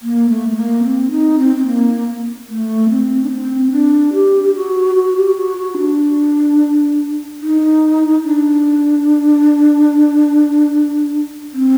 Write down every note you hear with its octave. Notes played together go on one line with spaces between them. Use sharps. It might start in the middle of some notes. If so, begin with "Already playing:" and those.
A#3
A3
A3
A#3
C4
D#4
C4
C4
A#3
A3
C4
D4
C4
D4
G4
G4
F#4
F#4
G4
F#4
F#4
D4
D#4
D4
C4